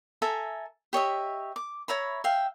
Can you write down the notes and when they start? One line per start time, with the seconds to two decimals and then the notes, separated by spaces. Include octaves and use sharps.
0.22 A4 E5 G#5 A#5
0.93 G4 C#5 D#5 E5
1.56 D6
1.88 C#5 E5 A#5 B5
2.24 E5 F5 G5